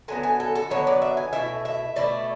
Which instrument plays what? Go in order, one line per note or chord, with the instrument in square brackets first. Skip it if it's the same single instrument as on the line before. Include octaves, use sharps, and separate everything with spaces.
[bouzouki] D3 F#3 B3 G#5
G#5
A4
A4
D3 F#3 B3 C#5
D5
E5
G#5
B2 A3 E4 E5
E5
B2 A3 E4 D5